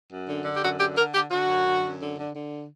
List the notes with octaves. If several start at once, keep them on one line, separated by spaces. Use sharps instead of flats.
F#2
D3
D3
G4
F#2 F#4
D3 G4
D3 A#4
D3 G4
D3 F#4
F#2
D3
F#2
D3
D3
D3